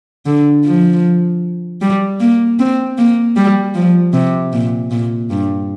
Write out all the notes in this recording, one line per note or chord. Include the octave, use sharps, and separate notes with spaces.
D3
F3
G3
A#3
C4
A#3
G3
F3
C3
A#2
A#2
G2